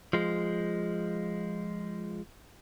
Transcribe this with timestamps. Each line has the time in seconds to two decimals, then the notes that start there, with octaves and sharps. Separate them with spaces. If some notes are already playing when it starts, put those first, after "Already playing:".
0.13 F3 G#3